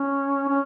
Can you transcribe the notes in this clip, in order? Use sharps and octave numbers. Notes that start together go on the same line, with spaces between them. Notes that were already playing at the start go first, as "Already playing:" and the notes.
Already playing: C#4
C#4